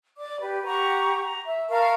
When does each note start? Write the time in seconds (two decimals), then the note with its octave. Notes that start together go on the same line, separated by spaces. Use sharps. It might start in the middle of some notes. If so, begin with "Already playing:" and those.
0.17 D5 D6
0.41 G4 B4
0.65 G4 F#5 A#5 C#6
1.23 A#5
1.45 E5
1.69 A#4 F5 A5 C#6